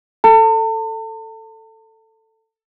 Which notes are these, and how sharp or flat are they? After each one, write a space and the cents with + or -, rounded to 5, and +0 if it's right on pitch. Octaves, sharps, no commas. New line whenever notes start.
A4 +5 A5 +40